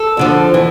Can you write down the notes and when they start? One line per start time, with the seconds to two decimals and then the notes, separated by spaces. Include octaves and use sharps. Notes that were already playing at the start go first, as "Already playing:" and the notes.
Already playing: A4
0.17 F2 D3 F3
0.54 E3